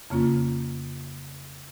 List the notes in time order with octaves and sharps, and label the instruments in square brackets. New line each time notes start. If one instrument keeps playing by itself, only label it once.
[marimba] F2 C#3 A#3 C#4 F4